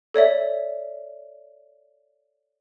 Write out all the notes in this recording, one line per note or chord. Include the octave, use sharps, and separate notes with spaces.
A4 C#5 D5 E5